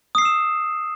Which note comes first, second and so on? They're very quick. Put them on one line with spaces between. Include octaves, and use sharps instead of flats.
D#6 C7 E6 E7